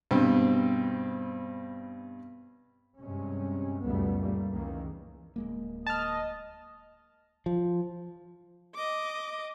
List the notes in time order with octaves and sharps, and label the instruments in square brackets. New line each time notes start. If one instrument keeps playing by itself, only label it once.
[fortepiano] G2 B2 C4
[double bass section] G2 C3 G#3 C#4
C#2 F#2 B2 G3 A3 B3
A#2 G3 A3 A#3
C#2 D#3 E3 A#3
[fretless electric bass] D1 G#3 A#3
[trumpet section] D#5 [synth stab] A5 F6
[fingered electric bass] F3
[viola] D#5 D6